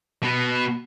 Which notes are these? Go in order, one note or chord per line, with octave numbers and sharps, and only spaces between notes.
B2 B3